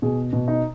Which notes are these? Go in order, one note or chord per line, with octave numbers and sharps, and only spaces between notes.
B2 G#4
B2
D#4